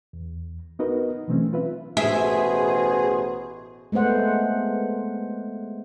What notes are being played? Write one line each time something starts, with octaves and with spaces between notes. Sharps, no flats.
E2
B3 D#4 F#4 A#4 B4 D#5
B2 E3 F#3 A3 C4 C#4
F4 B4 E5
A1 B2 G#4 C5 E5
G#3 A3 B3 C5 F#5